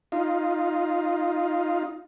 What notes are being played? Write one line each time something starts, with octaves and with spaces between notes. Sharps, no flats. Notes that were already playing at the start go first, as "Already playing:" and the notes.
D#4 F4